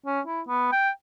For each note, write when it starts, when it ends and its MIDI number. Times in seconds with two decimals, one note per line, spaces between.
0.06 0.21 61
0.27 0.41 64
0.48 0.71 59
0.72 0.90 79